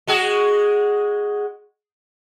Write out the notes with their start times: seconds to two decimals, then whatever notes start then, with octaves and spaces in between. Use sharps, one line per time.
0.07 G#3 F#4 G#4